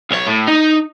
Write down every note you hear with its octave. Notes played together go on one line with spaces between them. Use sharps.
B1 C#5
A2
D#4